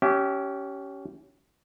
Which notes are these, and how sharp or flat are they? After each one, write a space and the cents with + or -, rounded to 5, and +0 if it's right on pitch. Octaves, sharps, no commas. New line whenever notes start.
C#4 +10 G4 -20 E5 +0